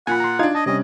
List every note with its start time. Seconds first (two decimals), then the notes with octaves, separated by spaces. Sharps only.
0.07 A#2 F#5 G#5 B5
0.20 A#5 C6
0.39 D4 D#4 F4 F5 G#6
0.55 D#5 A5
0.66 C3 G3 C#4 D#5